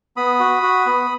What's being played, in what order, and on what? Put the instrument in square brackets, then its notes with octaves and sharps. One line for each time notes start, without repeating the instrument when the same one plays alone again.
[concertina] B3 B5 D#6
F#4
F#4
B3